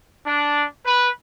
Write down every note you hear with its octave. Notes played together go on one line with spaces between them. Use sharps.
D4
B4